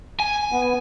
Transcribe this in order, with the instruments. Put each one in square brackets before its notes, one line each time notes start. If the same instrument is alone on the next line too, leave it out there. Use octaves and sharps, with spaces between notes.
[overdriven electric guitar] G#5
[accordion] B3